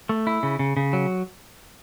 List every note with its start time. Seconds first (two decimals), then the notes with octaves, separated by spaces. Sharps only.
0.09 A3
0.27 E4
0.43 C#3
0.59 C#3
0.77 C#3
0.93 F#3